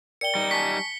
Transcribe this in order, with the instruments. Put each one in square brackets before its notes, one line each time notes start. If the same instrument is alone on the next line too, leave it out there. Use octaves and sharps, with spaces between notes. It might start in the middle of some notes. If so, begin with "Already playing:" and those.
[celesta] A#4 D5 G5 [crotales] C#7 G7
[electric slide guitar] G3 D#4
[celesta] G#5 A5 C#6 [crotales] B6